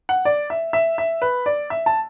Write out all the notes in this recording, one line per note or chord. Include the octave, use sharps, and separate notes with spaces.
F#5
D5
E5
E5
E5
B4
D5
E5
A5